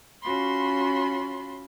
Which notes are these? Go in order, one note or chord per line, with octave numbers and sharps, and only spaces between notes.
C#4 F4 F#4 B5 C6